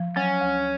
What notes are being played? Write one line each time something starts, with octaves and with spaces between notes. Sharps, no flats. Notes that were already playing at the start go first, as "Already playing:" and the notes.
Already playing: F3
F#3 C#4
D2